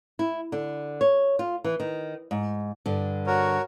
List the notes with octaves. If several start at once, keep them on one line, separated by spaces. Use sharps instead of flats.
E4
D3
C#5
F4
E3
D#3
G#2
G2 D3
F#4 A#4 C#5